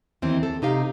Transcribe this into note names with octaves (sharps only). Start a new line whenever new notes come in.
D#2 E3 C4
A4
C3 D#4 G4 F5